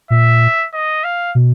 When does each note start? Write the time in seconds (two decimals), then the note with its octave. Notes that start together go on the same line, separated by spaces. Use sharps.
0.10 A#2 E5
0.73 D#5
1.04 F5
1.35 B2